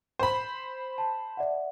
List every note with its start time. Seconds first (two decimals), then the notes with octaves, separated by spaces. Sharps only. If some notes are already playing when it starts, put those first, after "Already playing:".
0.19 C5 B5
0.98 A5
1.37 D5 E5 F#5